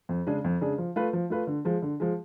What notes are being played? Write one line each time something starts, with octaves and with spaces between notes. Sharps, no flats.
F2
C#3 G#3 D4 G#4
F2
C#3 G#3 D4 G#4
F3
A3 F4 B4
F3
A3 F4 B4
D3
F3 G#3
D3
F3 G#3